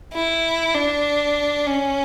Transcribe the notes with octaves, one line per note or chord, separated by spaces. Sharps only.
E4
D4
C#4